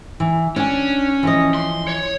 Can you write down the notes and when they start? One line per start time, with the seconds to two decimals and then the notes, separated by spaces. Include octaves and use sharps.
0.20 E3
0.56 C#4 D4 G#5
1.23 E3 F3 D#5
1.54 C6
1.87 C#5